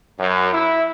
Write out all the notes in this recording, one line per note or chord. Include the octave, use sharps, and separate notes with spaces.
F#2
E4